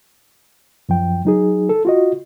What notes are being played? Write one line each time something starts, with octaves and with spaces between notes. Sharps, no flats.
F#2 F3 G5
F#3 D#4 G#4
A4
F4 F#4 D#5